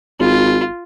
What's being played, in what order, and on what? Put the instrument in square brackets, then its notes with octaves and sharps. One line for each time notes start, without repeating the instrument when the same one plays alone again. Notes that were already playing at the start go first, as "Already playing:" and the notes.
[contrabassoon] G#1 [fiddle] F4